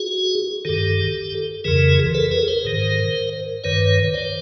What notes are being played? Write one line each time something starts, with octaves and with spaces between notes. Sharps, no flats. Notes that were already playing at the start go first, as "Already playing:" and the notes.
Already playing: F#4 G#4
G2 D#3 G4 A4
F2 C#3 E3 G#4 A#4
A4 B4
G#4 A#4
A#4 C5
G#2 D#3
G2 D#3 B4 C#5
C5 D5